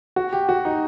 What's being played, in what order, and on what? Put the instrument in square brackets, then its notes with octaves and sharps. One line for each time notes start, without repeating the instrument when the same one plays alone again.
[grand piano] F#4
G4
F#4
D#4